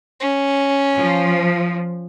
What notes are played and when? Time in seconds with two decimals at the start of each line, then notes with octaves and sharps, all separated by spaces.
0.20 C#4
0.95 F3